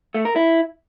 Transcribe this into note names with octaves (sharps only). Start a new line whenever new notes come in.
A3
A#4
E4